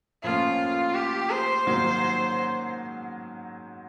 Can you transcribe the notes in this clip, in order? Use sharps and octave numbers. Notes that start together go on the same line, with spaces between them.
A2 F3 A#3 C#4 F4
G4
C5
G#2 D#3 F#3 A#3